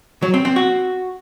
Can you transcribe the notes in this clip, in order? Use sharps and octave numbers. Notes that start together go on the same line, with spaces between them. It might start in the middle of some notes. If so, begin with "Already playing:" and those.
F#3
C4
C4
F#4